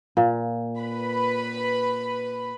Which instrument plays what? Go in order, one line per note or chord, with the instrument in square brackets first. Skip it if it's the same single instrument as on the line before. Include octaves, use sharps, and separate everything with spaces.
[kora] A#2
[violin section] B4 B5